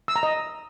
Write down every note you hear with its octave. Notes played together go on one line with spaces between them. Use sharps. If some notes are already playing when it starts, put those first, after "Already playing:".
E6
A#5
D#5